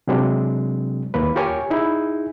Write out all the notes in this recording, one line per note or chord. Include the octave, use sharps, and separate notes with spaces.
C3 F#3 G#3 C4 D4
D#2 A#3 B4
F4 G4 A#4 C#5 G#5
D#4 E4 G#4